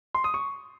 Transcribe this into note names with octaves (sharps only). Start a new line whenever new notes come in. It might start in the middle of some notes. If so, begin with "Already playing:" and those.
C6
D#6
C#6